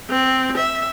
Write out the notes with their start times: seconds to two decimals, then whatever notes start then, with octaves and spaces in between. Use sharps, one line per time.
0.10 C4
0.57 E5